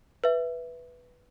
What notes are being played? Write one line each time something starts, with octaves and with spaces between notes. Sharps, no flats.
B4 E5